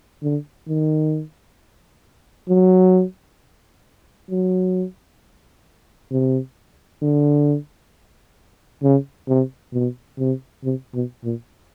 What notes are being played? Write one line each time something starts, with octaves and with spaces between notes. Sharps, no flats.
D3
D#3
F#3
F#3
C3
D3
C#3
C3
B2
C3
C3
B2
A#2